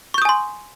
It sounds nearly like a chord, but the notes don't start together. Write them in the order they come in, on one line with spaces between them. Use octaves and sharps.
C#6 G6 D#6 G#5 C6